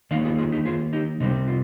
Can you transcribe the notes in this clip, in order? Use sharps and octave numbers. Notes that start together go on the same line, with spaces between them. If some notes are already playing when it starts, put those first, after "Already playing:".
D#3 A#3 D#4 D5 F5
F4 G#4
F4 G#4
D#4 G4
F4 G#4
D#4 G4
C3 G3 C4 D#4
F4